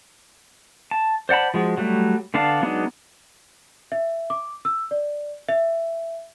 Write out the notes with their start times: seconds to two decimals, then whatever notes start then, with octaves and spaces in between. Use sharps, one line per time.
0.91 A5
1.29 C5 D5 F#5 A5 B5
1.54 F3 G#3 F#4
1.77 F#3 G3 A3
2.34 D3 B3 D4 F5 A5
2.62 F#3 G#3 B3 D4 D#4
3.92 E5
4.30 D6
4.65 E6
4.91 D5
5.49 E5